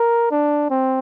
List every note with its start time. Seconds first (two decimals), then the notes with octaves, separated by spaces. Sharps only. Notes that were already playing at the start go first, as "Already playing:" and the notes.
Already playing: A#4
0.31 D4
0.71 C4